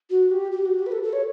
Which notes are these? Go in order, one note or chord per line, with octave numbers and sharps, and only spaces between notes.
F#4
G4
G4
F#4
G4
B4
A4
A4
C#5